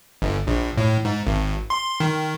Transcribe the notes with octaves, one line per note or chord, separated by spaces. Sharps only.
G1
A#1
A2
G#2
G#1
C6
D#3